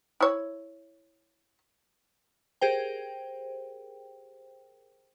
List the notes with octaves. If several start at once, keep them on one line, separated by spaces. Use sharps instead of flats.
E4 C#5
G4 G#4 A#4 C5 G5